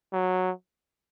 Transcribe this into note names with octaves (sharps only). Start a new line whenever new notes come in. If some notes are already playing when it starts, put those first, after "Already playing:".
F#3